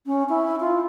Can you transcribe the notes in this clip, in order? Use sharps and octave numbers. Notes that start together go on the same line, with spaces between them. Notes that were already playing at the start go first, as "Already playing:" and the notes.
C#4
E4
F4